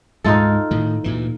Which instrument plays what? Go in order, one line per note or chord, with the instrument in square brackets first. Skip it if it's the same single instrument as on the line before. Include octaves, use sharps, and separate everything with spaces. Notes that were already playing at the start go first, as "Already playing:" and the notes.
[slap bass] D2 G#2 G#3 [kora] D#4 F4 A4
[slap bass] A2 D#3
D2 A#2 E3